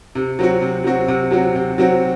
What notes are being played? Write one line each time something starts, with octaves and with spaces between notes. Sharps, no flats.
C3
F#3 C4 F#4
C3
F#3 C4 F#4
C3
F#3 C4 F#4
C3
F#3 C4 F#4